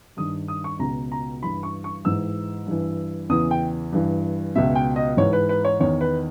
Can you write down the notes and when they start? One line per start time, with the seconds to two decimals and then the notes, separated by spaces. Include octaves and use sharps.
0.17 G2 D#3 D#6
0.48 D#6
0.64 C#6
0.79 C#2 B2 A#5
1.12 A#5
1.43 G2 E3 B5
1.63 C#6
1.84 C#6
2.05 G#2 E3 E6
2.67 G2 E3
3.29 E2 C#3 E3 D#6
3.51 G5
3.93 G2 E3
4.56 C#2 B2 E5
4.75 G5
4.96 D#5
5.17 G#2 E3 C#5
5.33 B4
5.49 B4
5.65 C#5
5.80 E2 D#3 C#5
6.01 B4